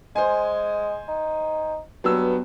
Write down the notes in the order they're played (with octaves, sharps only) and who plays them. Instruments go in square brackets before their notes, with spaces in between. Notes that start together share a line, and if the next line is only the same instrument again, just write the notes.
[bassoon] G#3 [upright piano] C5 G#5
[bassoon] D#4
[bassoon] G2 [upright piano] F#3 B3 E6